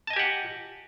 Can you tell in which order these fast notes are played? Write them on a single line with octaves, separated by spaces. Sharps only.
A5 D#5 G#5 G4 F#5